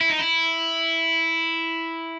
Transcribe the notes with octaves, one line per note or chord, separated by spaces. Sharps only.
E4
D#4
E4